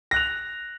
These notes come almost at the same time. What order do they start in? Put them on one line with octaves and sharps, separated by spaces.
A#6 F#6 F7